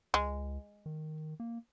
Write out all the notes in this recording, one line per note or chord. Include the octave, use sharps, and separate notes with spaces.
C#2 G#3
D#3
A#3